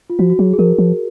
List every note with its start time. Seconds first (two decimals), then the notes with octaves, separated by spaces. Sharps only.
0.10 F4
0.19 F3 F#4
0.30 F#4
0.39 F#3 G#4
0.53 G#4
0.59 F3 A#4
0.78 F3